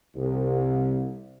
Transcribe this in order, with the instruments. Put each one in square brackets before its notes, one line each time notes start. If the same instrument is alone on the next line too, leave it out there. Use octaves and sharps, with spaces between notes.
[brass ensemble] C2